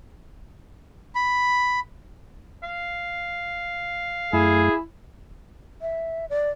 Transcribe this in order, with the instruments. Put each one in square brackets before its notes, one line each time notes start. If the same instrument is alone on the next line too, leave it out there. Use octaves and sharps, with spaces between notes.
[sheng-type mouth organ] B5
[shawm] F5
[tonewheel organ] F#2 A3 [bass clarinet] E4 [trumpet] G#4
[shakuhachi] E5
D5